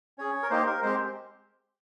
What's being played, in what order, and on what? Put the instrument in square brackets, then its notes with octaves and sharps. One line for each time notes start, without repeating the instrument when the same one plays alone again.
[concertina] C#4 G#4 C#5
A#4
A#3 D#4 G4 C5
A#4
G#3 C4 G4 C5